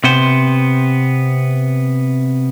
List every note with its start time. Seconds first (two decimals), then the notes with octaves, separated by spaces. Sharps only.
0.04 C3 B3 C5